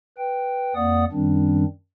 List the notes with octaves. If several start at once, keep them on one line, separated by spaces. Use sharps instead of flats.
B4 G5
F2 A#3 D5 F#5 D#6
F#2 D#3 G3 C4 D4